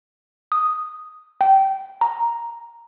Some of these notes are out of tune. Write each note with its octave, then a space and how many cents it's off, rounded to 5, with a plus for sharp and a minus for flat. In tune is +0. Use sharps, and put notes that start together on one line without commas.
D#6 +0
G5 -20
A#5 +5